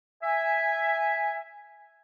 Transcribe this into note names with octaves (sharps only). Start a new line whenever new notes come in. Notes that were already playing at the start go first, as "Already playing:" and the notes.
E5 G#5